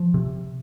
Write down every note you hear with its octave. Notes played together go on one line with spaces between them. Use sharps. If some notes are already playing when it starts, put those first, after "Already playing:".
Already playing: F3
C3